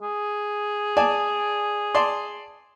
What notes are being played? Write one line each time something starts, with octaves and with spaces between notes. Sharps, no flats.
G#4
D5 G#5 A5
D5 A5 C6